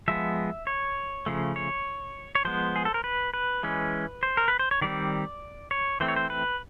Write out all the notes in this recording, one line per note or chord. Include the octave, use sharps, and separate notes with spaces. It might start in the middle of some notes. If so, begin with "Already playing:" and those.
F3 G#3 B3 E5
C#5
C#3 F3 A3
C#5
C#5
F3 G#3 B3 C5
G#4
A4
A#4
B4
B4
E3 G#3 C#4
C5
A#4
B4
C5
C#5
D#3 G3 C4 D5
C#5
E3 A3 C4 C5
C#5
C5
B4